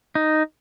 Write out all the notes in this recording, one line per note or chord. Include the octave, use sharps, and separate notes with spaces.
D#4